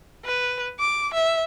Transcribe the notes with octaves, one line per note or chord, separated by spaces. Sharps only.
B4
D6
E5